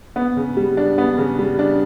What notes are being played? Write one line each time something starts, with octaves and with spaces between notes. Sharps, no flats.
B3
C#3
G3
D4
B3
C#3
G3
D4